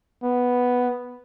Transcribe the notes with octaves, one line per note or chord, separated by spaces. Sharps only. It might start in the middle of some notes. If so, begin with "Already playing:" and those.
B3